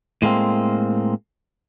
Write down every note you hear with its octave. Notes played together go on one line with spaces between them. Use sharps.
A2 G#3 A#3 C4